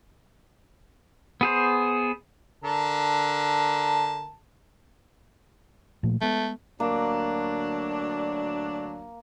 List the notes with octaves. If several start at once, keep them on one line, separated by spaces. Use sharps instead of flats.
B3 G#4 C5
D3 A#4 A5
A#2 F3 A3
G#3 A3 B3
D2 F#3 A#3 D4